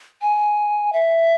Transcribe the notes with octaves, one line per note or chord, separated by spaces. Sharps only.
G#5
E5